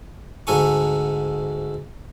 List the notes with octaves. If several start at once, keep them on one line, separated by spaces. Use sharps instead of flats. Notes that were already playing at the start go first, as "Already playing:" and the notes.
D2 G#2 A4 G#5 C#6